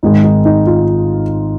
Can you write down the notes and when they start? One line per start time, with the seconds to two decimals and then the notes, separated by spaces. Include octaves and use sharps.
0.03 G#1 G#2 D#3 G#3 D#4
0.24 D#4
0.45 D#4
0.67 F4